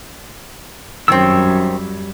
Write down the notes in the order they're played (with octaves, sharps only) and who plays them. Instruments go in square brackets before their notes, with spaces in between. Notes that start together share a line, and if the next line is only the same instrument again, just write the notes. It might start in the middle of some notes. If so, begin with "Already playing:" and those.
[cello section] F#2 [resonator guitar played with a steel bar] D#3 C4 [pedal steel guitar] G3 C#5 E6